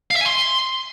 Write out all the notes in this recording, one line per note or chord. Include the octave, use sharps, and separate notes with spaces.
F5
E5
G#5
C6